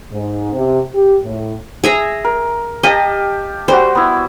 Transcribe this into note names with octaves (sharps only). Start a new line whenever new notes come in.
G#2
C3
G4
A2
G#4 E5 A#5
A#4
G4 D#5 F5 A5
G3 F#4 C5
B3 E4